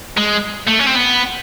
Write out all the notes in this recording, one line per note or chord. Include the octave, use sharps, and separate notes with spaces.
G#3
A3
C#4
C4
B3